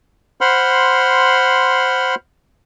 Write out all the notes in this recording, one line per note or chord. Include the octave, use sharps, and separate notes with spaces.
C5 F#5 B5 C6 F6